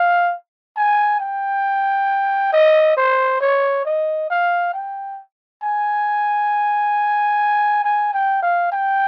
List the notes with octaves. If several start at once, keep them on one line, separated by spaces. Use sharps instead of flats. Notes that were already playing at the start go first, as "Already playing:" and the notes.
Already playing: F5
G#5
G5
D#5
C5
C#5
D#5
F5
G5
G#5
G#5
G5
F5
G5